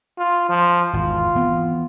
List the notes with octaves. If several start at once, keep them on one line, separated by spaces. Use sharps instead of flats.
F4
F3
G#1 E2 F4
E3 B3 C4